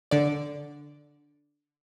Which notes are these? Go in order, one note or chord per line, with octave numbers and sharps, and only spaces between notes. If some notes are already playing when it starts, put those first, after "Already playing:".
D3 D5